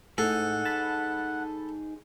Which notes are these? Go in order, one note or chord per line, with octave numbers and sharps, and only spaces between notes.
A2 D#4 G#4 A4 F#5
A5 B5 A6